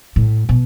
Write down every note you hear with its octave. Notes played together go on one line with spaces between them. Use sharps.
A2
B2